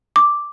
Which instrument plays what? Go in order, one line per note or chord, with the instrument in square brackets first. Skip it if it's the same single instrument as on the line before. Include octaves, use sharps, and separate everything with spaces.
[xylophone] D6